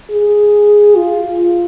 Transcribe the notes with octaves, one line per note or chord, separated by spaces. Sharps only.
G#4
F4